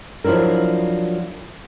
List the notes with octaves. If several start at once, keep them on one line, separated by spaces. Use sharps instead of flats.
F3 F#3 D4 E4 A#4